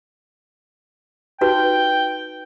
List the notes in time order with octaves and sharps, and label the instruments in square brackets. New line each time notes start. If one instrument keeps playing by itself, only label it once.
[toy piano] D#4 F#4 B4 [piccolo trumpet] G5